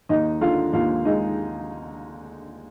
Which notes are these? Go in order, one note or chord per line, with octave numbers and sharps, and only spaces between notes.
D#2 D#4 D#5
D3 F4 F5
D#2 F4 F5
G#3 D#4 D#5